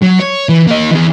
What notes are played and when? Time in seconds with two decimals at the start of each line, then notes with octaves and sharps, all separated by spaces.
0.02 F#3
0.19 C#5
0.49 E3
0.67 A#3 D#5
0.91 E2 E3